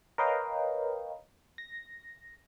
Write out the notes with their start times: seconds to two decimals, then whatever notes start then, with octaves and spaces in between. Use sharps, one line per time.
0.18 A#4 B4 C#5 D#5 F5 G5
1.58 A#6